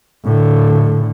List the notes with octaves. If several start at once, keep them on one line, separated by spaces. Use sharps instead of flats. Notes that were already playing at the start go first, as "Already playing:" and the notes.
A2 D3